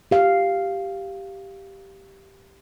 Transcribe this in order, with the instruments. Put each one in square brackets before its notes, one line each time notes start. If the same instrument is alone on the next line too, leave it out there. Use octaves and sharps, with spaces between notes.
[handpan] G4 F5